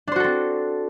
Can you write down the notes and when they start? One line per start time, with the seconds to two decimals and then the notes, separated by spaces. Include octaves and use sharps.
0.07 D4
0.12 C5
0.16 F#4
0.20 A4
0.24 C4